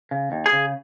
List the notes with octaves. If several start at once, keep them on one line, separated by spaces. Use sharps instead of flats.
C#3
D#2
G#4
C#3